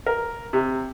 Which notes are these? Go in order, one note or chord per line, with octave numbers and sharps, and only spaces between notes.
A#4
C3